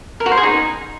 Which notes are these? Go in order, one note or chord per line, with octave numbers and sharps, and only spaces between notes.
A#4
F#4
C5
G#4
D#4